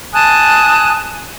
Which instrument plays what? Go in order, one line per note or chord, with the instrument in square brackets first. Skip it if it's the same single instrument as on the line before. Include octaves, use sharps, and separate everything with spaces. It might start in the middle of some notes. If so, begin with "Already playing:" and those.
[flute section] G#5 A5 D#6 F#6